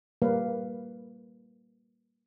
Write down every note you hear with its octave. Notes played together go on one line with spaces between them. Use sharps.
G3 A#3 B4 F5